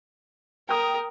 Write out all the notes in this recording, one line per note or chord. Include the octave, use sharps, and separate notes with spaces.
A#4 G5 D#6